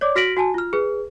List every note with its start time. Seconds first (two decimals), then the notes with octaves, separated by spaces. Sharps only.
0.01 C#5 D5 D6
0.16 F#4 F6 A#6 B6 D7 F#7
0.37 F#4 G#5 A5
0.54 F4 F6
0.73 G#4 B4